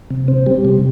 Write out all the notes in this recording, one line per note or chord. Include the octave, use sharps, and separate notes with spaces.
C3
C4
G3
C3